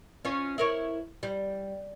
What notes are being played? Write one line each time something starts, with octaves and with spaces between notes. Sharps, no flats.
C#4 F4 C#5
E4 A#4 C#5
G3